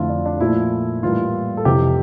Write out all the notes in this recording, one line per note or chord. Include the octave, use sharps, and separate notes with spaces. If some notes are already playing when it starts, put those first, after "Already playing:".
Already playing: F2 D3 F3 A3 E4 F4
D4
D4
A#2 F3 A3 E4
A2 E3 G3 A#3 F4
A4
F2 C3 E3 G4